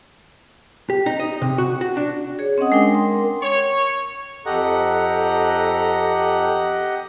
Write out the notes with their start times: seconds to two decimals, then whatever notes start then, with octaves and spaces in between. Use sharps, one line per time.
0.90 G4
1.06 D#4
1.20 D#5
1.42 C3
1.58 F#4
1.81 F#4
1.97 D4
2.39 G#4 C#5
2.58 C4 C#4 D#5 F#5 D#6
2.72 G#3 D4 A#4 G5
2.94 A#4 C6
3.43 C#5
4.46 F2 G4 A4 D#5 F#5 A#5